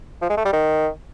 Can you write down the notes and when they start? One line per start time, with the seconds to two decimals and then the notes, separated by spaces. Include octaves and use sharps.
0.22 F3
0.30 G#3
0.37 A3
0.45 G3
0.53 D#3